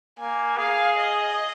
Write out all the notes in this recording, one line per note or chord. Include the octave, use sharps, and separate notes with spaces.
A#3 G#5
G#4 F5
D#5